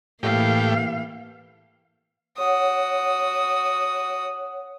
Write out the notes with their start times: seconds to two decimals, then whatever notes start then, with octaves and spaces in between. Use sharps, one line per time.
0.23 A2 E3 A#3 G4 F5
2.38 F#4 C#5 F#5 D#6